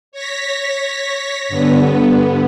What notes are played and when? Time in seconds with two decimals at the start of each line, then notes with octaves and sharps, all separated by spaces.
0.12 C#5 A#6 B6
1.49 G2 D3 B3